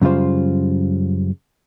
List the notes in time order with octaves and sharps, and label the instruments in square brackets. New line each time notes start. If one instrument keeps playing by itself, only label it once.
[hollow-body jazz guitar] F#2 C#3 G3 F4 C5